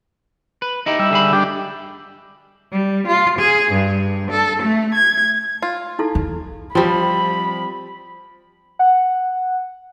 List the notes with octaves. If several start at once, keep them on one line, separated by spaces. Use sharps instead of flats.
B4
D#4 E4 G4
G3 E5
D3 G#4 B5
G3 D4 G4
G3
F4
G#4
G2
A4
A3
G#6
F4
D#4 E4 A4
E2
F3 G3 C4 B5
F#5